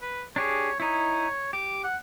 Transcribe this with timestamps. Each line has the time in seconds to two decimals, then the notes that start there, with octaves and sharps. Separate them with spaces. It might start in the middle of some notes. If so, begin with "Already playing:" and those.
0.02 B4
0.36 D4 G4 G#4 C#5
0.80 D#4 E4 C#5
1.53 G4 D6
1.84 F#5